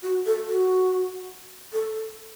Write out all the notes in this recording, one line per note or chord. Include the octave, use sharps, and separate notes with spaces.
F#4
A4
F#4
A4